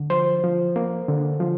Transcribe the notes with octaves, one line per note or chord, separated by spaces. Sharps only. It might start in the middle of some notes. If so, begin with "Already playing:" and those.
Already playing: D3
F3 C5
F3
A#3
D3
F3